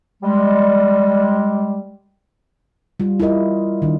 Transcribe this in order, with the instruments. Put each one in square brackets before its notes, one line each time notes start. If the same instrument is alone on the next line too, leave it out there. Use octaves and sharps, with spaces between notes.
[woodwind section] G3 G#3
[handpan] G3 F4
E4 F4 A#4 D#5
D#3 D4